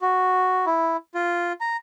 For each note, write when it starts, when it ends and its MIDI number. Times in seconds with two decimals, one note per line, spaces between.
0.01 0.65 66
0.66 0.97 64
1.15 1.52 65
1.61 1.77 82